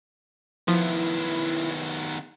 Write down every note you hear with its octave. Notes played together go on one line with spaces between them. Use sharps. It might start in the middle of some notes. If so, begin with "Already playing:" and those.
D#3 F3 B3 E4